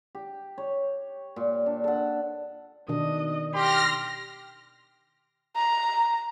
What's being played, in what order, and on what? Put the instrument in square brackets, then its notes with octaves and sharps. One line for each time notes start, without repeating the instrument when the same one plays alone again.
[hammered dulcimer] G4
C#5
A#2
D4
A4 F#5
[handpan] B2 D#3 D4 [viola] D#5
[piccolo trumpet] G4 [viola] C6 [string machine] F6 A#6
[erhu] A#5